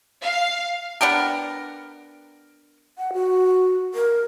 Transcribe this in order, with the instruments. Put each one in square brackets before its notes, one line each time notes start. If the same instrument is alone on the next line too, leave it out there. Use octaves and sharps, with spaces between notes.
[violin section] F5
[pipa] B3 D4 G4 A#4
[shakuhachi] F#5
F#4
A#4